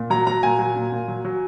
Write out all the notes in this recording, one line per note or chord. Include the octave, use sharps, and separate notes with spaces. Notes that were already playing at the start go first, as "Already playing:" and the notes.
Already playing: A#2
F#3 A#5
F#3 A#5
A#2 G#5
F#3
A#2
A#2
F#3
F#3